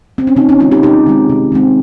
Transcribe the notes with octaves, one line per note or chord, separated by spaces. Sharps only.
C4
C#4
C3 C4 D#4
C#4
D#3 G#3 C4 C#4 F4
D#4 G4
C3 D#4 G4
D#3 G#3 C4
C3
D#3 G#3 C4